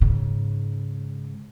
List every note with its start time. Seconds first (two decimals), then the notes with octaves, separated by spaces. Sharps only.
0.01 G#2 C#3